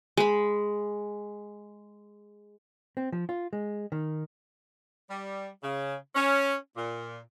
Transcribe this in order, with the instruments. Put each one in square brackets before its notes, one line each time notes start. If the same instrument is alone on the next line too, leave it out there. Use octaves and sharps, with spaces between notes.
[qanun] G#3 B5
[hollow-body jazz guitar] C4
F3
F4
G#3
D#3
[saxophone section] G3
C#3
C#4
A#2